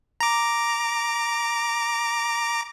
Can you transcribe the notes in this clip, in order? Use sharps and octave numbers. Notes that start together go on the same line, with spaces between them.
A#5 D6